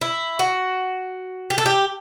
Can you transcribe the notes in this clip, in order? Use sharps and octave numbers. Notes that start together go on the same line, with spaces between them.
E4
F#4
G4
A4
G4